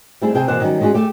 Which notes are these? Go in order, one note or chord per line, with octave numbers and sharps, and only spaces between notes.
G3 A3 C4 E4 G#4
C3 C4 G#4 G5
B2 E3 A#3 D4 C5 F#5
D#3 F#3 G3 C#4
G#3 C#4 D4 F#4 G#4
A3 G4